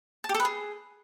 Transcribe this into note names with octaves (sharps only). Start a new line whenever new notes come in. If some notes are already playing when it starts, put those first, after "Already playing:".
A5
G4
A4
B4
G#4